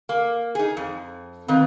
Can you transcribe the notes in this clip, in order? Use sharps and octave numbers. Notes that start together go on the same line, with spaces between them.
A#3
D#4 G#4
F2
D#3 A#3 C4 B4